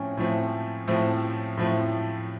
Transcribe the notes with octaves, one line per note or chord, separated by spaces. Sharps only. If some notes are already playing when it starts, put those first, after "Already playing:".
Already playing: A2 F3 A3 C4 C#4
A2 F3 A3 C4
A2 F3 A3 C4
A2 F3 A3 C4